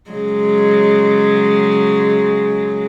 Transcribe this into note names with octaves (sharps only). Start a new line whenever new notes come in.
C#3 F#3 G#3